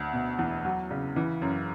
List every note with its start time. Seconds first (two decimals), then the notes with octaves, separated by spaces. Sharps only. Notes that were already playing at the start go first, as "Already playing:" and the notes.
Already playing: D2
0.13 B2
0.39 E2
0.65 F#3
0.91 C#3
1.16 E3
1.42 F#2